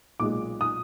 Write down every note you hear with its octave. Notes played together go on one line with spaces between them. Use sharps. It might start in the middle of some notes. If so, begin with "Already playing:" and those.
B1 A#2 G#3 D6
D#6